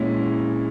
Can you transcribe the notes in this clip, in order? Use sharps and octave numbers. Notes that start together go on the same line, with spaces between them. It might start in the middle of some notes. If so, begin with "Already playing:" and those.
Already playing: A#2 G#3 C#4 E4